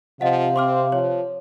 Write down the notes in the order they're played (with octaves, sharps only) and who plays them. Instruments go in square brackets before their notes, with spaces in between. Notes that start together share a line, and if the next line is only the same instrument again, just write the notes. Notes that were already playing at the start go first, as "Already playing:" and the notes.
[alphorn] C3 [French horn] F3 [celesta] D#5 F#5 [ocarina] F5
[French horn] C4 [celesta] C6 D6 F6
[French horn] F3 [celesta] C#5